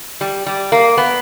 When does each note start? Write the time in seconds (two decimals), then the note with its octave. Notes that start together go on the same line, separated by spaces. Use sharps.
0.21 G3
0.46 G3
0.72 A#3
0.98 B3